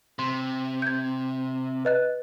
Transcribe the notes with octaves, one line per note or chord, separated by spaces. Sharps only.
C3 C6
G6 G#6
B4 D#5 F#6